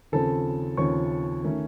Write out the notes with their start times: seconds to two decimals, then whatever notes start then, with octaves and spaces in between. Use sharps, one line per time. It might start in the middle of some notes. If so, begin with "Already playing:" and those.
0.12 D#2 C#3 F3 C4 A4 A5
0.77 D#2 C#3 F3 C4 C#5 C#6
1.44 D#3 A3 C#4